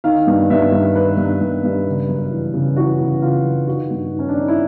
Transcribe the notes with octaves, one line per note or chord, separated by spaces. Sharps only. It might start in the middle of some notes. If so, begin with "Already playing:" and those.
D#3 F5
G2
G2 E5
G2
D#3 B4
G2
G2
G2
C#3
F#2
E3
C#3
E3 F#4
C#3
C#3 F4
F#2
D#3 F#4
G2
D#3
C#4
D4
D#3 D#4
E4